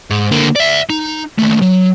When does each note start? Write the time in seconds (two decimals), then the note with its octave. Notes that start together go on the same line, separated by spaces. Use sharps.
0.10 G#2
0.31 D3 A#3
0.56 D5 E5
0.90 D#4
1.39 D#2 A3
1.62 F#3